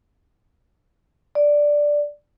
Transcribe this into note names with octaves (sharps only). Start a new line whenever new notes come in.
D5